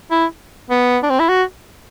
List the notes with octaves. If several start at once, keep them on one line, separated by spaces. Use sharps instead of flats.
E4
B3
D4
C4
E4
F#4